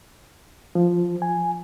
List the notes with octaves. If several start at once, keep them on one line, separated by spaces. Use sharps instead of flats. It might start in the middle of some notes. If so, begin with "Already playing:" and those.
F3
G#5